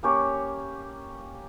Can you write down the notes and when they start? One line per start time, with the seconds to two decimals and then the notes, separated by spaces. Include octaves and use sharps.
0.03 A#3 C#4 G4 C#5